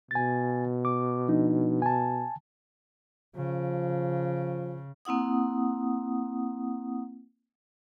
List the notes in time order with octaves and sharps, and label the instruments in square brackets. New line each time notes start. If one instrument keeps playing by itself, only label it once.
[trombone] B2 [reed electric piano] G#5 A6
[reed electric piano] D6
F3 D4 D#4
G#5 A5
[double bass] C#3 [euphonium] F3
[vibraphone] A#3 C4 E4 F#5 D#6